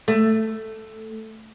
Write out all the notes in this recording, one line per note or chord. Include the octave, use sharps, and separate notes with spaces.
A3